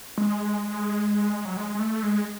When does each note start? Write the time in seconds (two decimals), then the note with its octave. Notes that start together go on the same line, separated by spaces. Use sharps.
0.18 G#3
1.45 F#3
1.57 G#3
1.75 G#3
1.80 A3
2.03 G#3